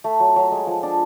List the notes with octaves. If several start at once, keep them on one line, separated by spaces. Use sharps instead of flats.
A3
F#3
F#3
G#3
F3
D4